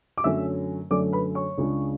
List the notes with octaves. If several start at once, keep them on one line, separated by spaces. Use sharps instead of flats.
D6
F#2 D3 F#3 A3 C#4 E5 E6
F#2 D3 F#3 A3 C#4 D5 D6
B4 B5
C#5 C#6
C#2 C#3 G#3 D4